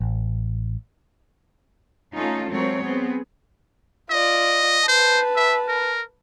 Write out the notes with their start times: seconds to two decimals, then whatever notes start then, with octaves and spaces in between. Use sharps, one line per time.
0.01 A1
2.15 A3 C#4 D#4 F4 A4
2.51 F#3 G#3 A3 C4 A#4 C#5
2.82 B3 C4 G#4
4.11 F4 D5 D#5
4.88 B4 C5 A5
5.36 E5
5.68 A#4